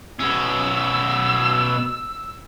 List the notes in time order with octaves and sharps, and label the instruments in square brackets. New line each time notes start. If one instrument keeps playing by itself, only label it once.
[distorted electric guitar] B2 C#4 [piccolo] E6